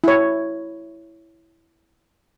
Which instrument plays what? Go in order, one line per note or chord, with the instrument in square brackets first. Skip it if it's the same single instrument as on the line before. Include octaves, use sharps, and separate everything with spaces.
[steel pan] E4 C#5